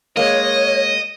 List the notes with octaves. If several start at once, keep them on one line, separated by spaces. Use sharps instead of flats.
G#3 A#3 C#5 D#5